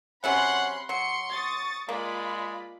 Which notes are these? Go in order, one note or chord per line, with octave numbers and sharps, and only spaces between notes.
C3 F#3 C#4 F#5 B5 C6 F#6
F#3 C6 C#7
C#6 D#6 A6
G#3 A#3 F4 D5 B5